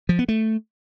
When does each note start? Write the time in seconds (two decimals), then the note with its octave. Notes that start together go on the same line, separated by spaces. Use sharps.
0.09 F3
0.19 B3
0.28 A3